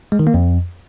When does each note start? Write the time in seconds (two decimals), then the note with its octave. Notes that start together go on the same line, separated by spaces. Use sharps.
0.12 G#3
0.19 D#3
0.27 A#3
0.34 F2